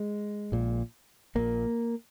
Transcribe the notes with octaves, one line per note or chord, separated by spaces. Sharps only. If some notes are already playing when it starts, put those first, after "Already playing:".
Already playing: G#3
A#1 A#2
A#1 A#2 A#3